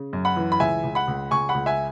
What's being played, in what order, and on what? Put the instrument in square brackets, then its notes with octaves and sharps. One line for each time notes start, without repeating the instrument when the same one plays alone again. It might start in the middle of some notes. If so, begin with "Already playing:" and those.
Already playing: [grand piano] C#3
F#2
F#5 B5
E3
B5
C#2 E5 G#5
C#2
F#5 B5
C#2
C#2 G#5 C#6
F#5 B5
C#2
E5 G#5